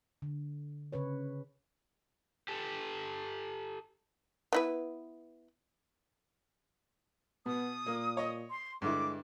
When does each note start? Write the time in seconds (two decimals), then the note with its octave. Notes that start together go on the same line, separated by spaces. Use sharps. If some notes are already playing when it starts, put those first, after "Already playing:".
0.22 D3
0.92 C#3 C#4 B4 C#5
2.48 G4 A4
4.53 B3 E4 B4
7.46 B2 B3 D#6
7.86 A#2 A#3
8.17 C#5 D#5
8.50 C6
8.82 G2 D3 G#3 E4 D6